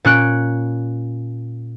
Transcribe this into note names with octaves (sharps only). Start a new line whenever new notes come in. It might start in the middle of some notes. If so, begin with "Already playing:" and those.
A#2 C#4 F#6 D7